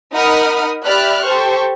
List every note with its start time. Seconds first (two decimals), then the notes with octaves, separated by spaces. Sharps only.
0.13 D#4 A#4 F#5 B5 D#6 F6
0.85 G4 D5 E5 B5 F6 F#6
1.25 G4 A4 C5 C#6